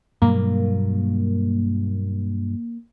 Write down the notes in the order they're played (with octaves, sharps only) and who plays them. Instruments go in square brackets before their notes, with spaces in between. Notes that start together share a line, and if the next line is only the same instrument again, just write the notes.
[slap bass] G2 B2 F#3 [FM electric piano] A#3